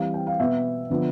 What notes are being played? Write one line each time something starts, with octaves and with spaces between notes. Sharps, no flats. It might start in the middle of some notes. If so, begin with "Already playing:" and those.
Already playing: E3 G3 C4 F5
G5
F5
B2 B3 E5
D3 F3 B3